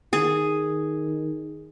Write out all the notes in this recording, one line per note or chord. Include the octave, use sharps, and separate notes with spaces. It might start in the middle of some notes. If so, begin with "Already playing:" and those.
D#3 G#4